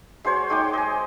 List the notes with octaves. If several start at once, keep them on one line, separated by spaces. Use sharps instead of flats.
G#3 F#4 C5 C#5
G#3 D#4 G5 D6
D#5 G#5